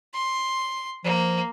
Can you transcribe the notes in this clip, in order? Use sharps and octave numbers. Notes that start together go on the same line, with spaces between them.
C6
F3 A#3